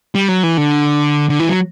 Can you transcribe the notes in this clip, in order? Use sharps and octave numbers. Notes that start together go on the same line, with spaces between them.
G3
F#3
E3
D3
D3
E3
F#3